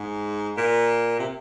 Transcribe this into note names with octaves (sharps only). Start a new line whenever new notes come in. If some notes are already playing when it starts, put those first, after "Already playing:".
Already playing: G#2
A#2
C3